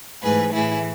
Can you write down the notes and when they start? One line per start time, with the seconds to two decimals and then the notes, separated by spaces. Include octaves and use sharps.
0.22 G#2 E3 A3 G#4 B4
0.53 A2 E3 A3 E4 G#4